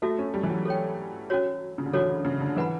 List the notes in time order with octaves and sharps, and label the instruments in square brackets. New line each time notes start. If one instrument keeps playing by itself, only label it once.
[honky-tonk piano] A3 [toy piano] F#4 A4 E5
[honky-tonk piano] C#4
G3
E3
F#3
[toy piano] A4 C#5 G5
C#4 F#4 C#5
[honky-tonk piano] C#3
D3
[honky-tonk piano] E3 [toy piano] F#4 A4 C#5
[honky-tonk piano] C#3
D3
[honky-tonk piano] E3 [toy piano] B4 F#5 B5